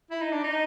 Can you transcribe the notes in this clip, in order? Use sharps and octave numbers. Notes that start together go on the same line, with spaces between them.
E4
D#4
D4
D#4